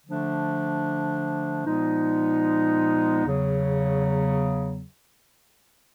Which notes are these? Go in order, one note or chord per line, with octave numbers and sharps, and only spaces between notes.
D3 F3 A3 D4
A#2 F3 G#3 B3 D#4
E2 C#3 F#3